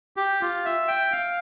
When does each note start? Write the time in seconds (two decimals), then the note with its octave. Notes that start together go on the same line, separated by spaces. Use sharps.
0.17 G4
0.41 F4
0.65 E5
0.88 G5
1.12 F5